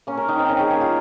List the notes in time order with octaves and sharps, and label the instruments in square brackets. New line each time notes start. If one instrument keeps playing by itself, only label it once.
[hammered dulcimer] A#3 C#4
A#4
D#3 D#4
C4
D#3 C#4
G#4
A#3 G#4
F4